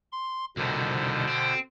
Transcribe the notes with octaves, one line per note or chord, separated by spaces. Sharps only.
C6
C2 B2 D3 D#3 C5
C4